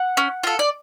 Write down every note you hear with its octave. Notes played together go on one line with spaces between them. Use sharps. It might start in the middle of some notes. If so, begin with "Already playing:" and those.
Already playing: F#5
C#4
F4 A4
D5